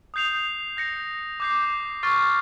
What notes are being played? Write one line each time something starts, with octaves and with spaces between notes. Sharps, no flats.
D#6 G6 C7 F7
G6 A#6 C#7 F7
D6 G6 C7
C#6 F6 A6 C7